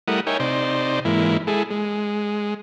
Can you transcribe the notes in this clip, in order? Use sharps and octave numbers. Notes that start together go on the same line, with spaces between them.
G3 A3 E4 A#4 F#5 D#6
D#4 A#4 C#5 E5 G5 G#5
C3 D#4 C5 D5
G#2 E3 A#3 E4
G#3 E4 G#4 A4
G#3